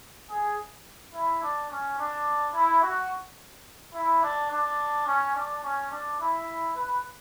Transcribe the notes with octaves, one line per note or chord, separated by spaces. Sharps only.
G#4
E4
D4
C#4
D4
E4
F#4
E4
D4
D4
C#4
D4
C#4
D4
E4
B4